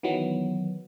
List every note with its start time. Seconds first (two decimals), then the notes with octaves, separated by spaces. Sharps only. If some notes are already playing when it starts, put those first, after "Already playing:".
0.03 D#3 E3 F#3 B3